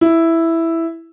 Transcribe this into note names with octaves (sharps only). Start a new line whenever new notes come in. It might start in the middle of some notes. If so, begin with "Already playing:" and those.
E4